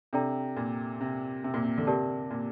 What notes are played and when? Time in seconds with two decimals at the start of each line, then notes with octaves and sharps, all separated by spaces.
0.13 C3 D4 A4 D5 G5 A#5
0.57 A#2
1.01 C3
1.44 C3
1.54 A#2
1.64 C3
1.78 D3
1.87 C3 G4 A#4 D5 A5
2.31 A#2